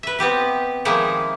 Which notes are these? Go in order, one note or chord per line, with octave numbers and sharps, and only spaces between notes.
B4 E5
B3 C4 G4 B4
D#3 F3 G#3 A#3 D#4 E4